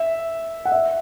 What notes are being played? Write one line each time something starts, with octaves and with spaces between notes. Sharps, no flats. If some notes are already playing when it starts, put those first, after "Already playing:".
Already playing: E5
F#5
E5